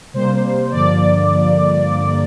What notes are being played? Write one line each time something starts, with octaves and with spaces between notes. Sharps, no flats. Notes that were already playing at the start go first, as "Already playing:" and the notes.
C3 G3 A#3 C5
G2 D3 F3 A#3 D5